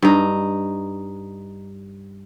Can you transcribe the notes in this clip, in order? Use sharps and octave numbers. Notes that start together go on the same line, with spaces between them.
G2 D#4